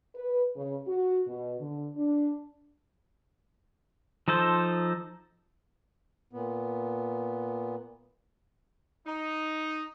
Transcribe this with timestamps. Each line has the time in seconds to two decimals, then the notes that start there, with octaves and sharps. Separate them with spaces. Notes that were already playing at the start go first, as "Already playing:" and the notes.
0.16 B4
0.57 C#3
0.87 F#4
1.27 B2
1.60 D3
1.96 D4
4.28 F3 D#4 A4 C5
6.33 A#2 B3
9.06 D#4